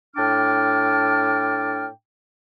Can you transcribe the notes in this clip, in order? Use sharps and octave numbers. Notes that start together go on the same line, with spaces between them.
A2 D4 G5 A5 D6 F6